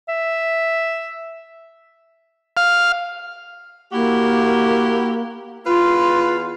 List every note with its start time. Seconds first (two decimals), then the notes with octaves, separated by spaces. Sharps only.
0.09 E5
2.57 F5
3.92 A#3 E4 F#4 G4
5.66 E2 F4 B4 F5